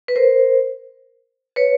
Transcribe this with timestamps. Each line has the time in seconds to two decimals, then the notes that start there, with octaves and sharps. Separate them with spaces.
0.08 B4
0.15 A#4 C5
1.56 B4 C#5